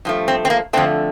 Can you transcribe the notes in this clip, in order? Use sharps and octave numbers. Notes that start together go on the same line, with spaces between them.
G2 F3 A3
C4
C4
A#3
F2 D3 A3 C4